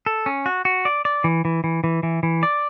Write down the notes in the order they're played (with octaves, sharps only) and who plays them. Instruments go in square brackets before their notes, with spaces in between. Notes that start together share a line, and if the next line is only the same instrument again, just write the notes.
[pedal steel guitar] A4
C#4
F#4
F#4
D5
D5
E3
E3
E3
E3
E3
E3
D5